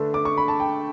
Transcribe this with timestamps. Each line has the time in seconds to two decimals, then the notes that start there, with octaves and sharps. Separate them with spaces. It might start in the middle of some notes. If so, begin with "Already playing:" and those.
Already playing: D3 A3 D4 B4
0.14 D6
0.25 C#6
0.37 B5
0.48 A5
0.60 G5